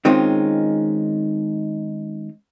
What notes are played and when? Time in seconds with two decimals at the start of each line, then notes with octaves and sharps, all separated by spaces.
0.05 D#3 G#3 C4 C#4 D#4 F4